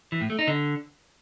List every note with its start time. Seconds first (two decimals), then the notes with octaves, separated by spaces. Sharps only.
0.12 E3
0.21 A2
0.30 A3
0.39 D#4
0.48 D3